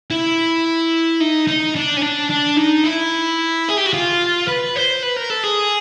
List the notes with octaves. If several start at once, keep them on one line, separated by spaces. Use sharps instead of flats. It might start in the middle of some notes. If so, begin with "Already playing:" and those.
E4
D#4
D#4
D4
C#4
D4
D4
D#4
E4
G#4
G4
F#4
F4
B4
C5
B4
A#4
A4
G#4